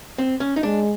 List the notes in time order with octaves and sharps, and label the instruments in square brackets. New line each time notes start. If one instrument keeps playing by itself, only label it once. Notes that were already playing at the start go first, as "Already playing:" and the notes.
[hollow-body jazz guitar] C4
C#4
D#4
[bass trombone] G#3 [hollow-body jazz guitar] D4